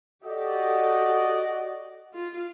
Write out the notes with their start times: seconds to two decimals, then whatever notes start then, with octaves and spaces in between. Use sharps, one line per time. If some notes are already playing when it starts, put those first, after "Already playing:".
0.24 F#4 G4 A4 D5 D#5
2.14 F4